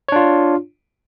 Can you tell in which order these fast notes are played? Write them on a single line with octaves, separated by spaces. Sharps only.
C#5 D4 F4